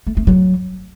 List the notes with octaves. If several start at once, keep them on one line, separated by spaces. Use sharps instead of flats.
A3
A3
F#3